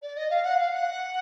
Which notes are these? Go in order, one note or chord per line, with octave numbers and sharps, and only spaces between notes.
D5
D#5
F5
F#5
F5
F#5